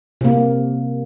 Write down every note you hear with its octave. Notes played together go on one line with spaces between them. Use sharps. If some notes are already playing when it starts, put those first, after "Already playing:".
C3 A#3